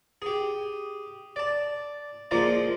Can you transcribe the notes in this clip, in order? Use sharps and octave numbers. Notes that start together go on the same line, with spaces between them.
G4 G#4
D5 A5
F3 G#3 A#3 F4 C5 D5